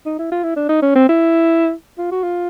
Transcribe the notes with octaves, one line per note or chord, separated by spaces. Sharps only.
D#4
E4
F4
E4
D4
D#4
C#4
C4
E4
F4
F#4
F4